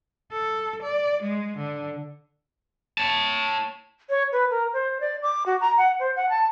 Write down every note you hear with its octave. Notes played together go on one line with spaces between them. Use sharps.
A4
D5
G#3
D3
C#5 A5
C#5
B4
A#4
C5
D5
D6
F#4
A#5
F#5
C5
F#5
A5